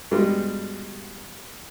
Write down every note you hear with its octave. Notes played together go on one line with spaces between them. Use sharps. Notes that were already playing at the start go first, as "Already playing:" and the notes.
G2 B2 G3 G#3